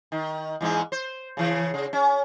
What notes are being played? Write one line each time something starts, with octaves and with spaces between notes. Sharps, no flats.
D#3
E2 G#2 G#3
C5
C#3 E3
C#3
C#4